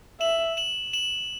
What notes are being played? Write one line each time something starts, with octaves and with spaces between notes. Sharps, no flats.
E5 E7 F#7
E7 F#7
E7 F#7